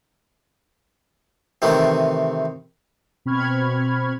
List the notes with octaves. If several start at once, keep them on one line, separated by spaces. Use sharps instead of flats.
C3 D#3 E3 A3 C4
B2 C4 B5 C#6 F6 G#6